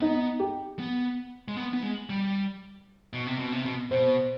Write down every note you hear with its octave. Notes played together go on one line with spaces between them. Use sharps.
B3 D#4
G4
B3
G#3
B3
B3
G#3
G3
B2
C3
B2
C3
B2
B2 C5